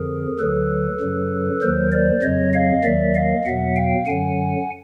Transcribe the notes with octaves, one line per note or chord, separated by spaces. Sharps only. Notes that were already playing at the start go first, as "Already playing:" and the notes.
Already playing: F2 D3 F3 G#4 A#4
D2 D3 F#3 A4 B4
F#2 C#3 F#3
D#2 D#3 F#3 A#4 C5
C5 D5
F2 C#3 F#3 C#5 D#5
D#5 F5
D#2 D#3 F#3 D5 E5
D#5 F5
E2 B2 F#3 E5 F#5
F5 G5
F#2 D3 F#3 F#5 G#5